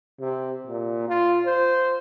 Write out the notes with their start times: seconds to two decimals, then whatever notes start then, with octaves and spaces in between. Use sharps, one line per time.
0.20 C3
0.67 A#2
1.09 F4
1.46 C5